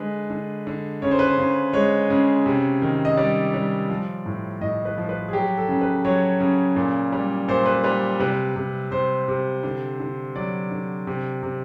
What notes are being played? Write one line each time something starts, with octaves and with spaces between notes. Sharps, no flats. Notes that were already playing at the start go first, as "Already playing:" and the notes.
Already playing: D3 G#3 B4
D3
D3
C#3 C#5
C5
B4
C5
C#3
G#3 C#5
C#3
C3
D#3
D#5
G3 D5
G3
F3
A2
A2 D#5
B4
F3
B4
G#4
F#3 G4
A4
C#3
B4
F#3 C#5
C#3
A#2
G3
A#2 C5
B4
G3 B4
C3 B4
C3
C3 C5
C3
D3
D3
F#3 D5
D3
C3
C3